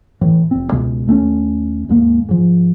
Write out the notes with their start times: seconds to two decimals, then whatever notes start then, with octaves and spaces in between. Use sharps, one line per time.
0.21 A2 E3
0.51 F1 C4
0.72 C#2 B2 G#3
1.07 D#2 A3 C4 C#4
1.89 D#2 G#2 G#3 A#3
2.29 G#2 F3